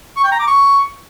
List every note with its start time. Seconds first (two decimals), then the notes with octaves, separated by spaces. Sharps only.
0.16 C#6
0.24 G5
0.32 A#5
0.39 D6
0.47 C#6